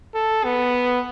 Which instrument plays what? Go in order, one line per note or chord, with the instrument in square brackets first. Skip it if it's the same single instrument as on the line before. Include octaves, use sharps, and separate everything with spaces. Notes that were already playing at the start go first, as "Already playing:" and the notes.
[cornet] A4
B3